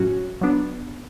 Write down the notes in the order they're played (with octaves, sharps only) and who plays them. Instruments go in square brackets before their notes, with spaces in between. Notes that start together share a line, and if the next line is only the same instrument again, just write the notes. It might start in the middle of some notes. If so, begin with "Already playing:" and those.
Already playing: [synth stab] A2 F#3 C#4 F#4
F#3 B3 D4